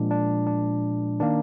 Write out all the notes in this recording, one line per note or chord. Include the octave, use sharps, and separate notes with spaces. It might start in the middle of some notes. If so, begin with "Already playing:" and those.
Already playing: A#2 F3 G#3 D4
D4
D4
D#3 A#3 D4